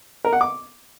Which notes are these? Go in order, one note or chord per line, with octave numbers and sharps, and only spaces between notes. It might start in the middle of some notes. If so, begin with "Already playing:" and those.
A#4
F#5
D6